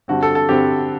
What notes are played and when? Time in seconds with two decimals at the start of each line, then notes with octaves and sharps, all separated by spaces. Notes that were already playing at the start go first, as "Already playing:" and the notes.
0.08 G2 D3 G3 C4 F#4
0.23 A4
0.35 A4
0.49 G2 D3 G3 C4 G4